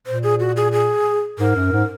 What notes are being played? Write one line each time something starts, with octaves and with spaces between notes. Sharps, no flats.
A#2 C5
G#4
F#4
G#4
G#4
G#2 A#4
F#2
G#2